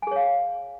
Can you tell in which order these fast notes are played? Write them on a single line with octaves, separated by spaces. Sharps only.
G#5 G#4 C#5 F5